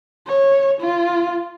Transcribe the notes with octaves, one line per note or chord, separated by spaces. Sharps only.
C#5
F4